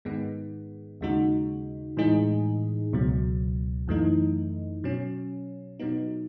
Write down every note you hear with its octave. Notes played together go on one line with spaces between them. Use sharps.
G#2 D#3 G#3 B3
D#2 C#3 G#3 D#4 F#4
A2 E3 G#3 D#4 G#4
C#2 B2 F#3
F#2 E3 A3 D#4
B2 F#3 C#4
B2 F#3 B3 D#4